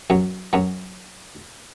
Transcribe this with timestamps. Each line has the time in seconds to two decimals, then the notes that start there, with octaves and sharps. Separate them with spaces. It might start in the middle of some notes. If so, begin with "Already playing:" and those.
0.10 F#2 F#3
0.53 F#2 F#3